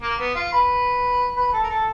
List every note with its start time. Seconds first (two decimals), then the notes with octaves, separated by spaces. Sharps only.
0.01 A#3
0.18 B3
0.35 F4
0.53 B4
1.36 B4
1.53 A4
1.64 A#4
1.70 A4